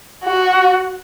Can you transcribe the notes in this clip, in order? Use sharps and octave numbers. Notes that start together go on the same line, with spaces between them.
F#4